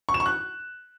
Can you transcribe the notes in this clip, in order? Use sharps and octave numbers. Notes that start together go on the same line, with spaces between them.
C#6
E7
C#6
F#6